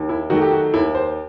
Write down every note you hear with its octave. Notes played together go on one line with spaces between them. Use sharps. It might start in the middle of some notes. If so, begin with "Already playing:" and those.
Already playing: D#2
E4
D#3 F#3 A3 F#4
G4
F#4
D#2 E4
C5